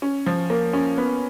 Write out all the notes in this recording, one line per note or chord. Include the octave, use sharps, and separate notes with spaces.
C#4
F3
A#3
C#4
B3